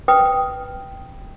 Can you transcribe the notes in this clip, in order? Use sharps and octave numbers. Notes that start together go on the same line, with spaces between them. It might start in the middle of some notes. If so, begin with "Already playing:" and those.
B4 G5 D#6